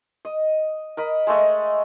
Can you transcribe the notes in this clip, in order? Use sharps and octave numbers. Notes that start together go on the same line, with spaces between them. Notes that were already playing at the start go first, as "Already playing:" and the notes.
D#5
A#4 D#5 B5
G#3 A3 D#5